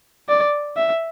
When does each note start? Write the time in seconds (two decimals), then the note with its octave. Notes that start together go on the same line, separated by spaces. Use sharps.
0.29 D5
0.77 E5